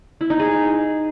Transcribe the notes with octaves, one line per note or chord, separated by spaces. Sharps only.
E4
D#4
G#4